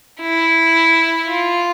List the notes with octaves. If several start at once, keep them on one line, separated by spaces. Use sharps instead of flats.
E4
F4